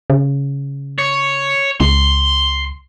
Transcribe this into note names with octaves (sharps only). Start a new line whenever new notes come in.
C#3
C#5
C#2 C6